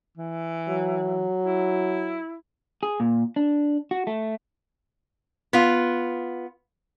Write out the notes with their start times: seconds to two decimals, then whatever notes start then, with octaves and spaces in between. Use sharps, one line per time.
0.17 E3
0.69 F#3
1.43 E4
2.83 G#4
3.00 A#2
3.36 D4
3.91 F#4
4.07 A3
5.53 B3 F4